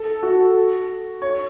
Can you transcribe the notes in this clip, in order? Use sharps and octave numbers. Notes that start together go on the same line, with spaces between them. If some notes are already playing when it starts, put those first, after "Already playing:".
Already playing: A4
F#4
C#5